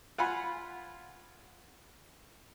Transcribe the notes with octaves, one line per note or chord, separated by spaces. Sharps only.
F4 F#5 G#5 B5